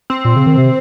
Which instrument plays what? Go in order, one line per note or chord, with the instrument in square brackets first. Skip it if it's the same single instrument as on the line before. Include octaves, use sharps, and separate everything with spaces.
[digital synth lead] C4
[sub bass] A#2
C#3
D#3
C3